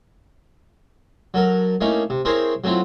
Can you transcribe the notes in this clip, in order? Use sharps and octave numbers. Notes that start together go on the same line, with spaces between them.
F#3 A4 A#4
A3 A#3 C#4 D#4 E4
C3
C4 E4 G#4 A#4 C5 C#5
F#3 A3 C4 E4 F4